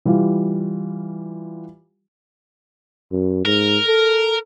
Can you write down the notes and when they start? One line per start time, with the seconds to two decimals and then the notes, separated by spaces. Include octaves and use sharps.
0.05 E3 G3 F4
3.12 F#2
3.45 G#2 A#4
3.88 A4